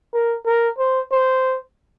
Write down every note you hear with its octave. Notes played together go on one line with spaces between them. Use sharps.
A#4
A#4
C5
C5